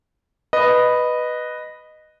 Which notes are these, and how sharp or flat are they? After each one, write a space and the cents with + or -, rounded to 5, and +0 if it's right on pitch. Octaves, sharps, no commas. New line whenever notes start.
B4 +0 D#5 -10